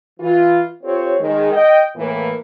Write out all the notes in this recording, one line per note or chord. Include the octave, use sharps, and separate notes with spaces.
E3 F4
C4 F4 G4 A4 C#5
D#3 G#3
D#5 G5
A2 E3 A#3